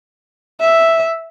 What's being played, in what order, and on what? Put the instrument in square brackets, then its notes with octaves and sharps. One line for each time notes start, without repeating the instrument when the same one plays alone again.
[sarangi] E5